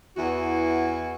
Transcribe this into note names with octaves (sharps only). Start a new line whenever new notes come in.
E2 E3 F#4